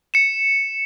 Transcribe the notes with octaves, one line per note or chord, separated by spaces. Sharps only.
C#7 E7